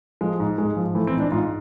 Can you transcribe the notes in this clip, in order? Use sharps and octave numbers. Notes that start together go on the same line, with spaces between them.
F3 G#3
G#2
G#2 G#3
F3
E3 A3
C4
G#2
D4
G#2 F4